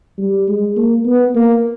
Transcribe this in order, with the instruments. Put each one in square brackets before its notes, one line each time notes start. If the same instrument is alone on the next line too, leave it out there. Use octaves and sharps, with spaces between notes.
[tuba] G3
G#3
A#3
B3
A#3